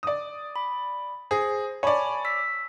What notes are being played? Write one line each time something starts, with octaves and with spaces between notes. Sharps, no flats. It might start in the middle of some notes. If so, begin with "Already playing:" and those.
D5 D#6
B5
G#4 C5 A#6
C#5 D5 G#5 A5 B5
E6 B6